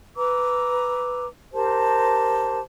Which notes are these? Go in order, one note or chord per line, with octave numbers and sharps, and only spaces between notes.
B4 A#5 D6 E6
G4 A#4 C5 A5